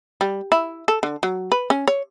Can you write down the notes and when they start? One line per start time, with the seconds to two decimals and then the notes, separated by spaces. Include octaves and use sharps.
0.21 G3
0.52 E4
0.88 A4
1.03 D3
1.23 F#3
1.52 B4
1.70 C#4
1.88 C#5